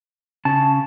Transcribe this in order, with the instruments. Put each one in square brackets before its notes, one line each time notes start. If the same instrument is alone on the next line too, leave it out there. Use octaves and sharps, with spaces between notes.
[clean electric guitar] C#3 [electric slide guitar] A5